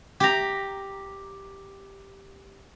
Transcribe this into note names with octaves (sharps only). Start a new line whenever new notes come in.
G4 A#5